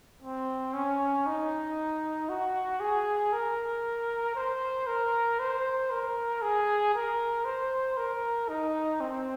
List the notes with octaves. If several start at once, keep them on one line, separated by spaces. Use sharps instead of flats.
C4
C#4
D#4
F#4
G#4
A#4
C5
A#4
C5
A#4
G#4
A#4
C5
A#4
D#4
C4